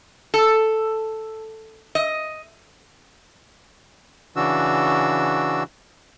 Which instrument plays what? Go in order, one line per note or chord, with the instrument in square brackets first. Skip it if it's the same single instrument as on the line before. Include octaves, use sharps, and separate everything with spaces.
[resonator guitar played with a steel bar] A4
D#5
[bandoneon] C#3 E3 D4 F#4 E6